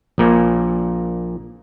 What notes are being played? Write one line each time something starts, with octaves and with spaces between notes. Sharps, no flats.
A#1 A#2 A#3